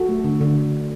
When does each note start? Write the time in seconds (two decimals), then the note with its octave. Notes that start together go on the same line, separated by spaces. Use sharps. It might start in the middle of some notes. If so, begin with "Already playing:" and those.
Already playing: F#4 A4
0.09 A3
0.24 D3
0.41 D3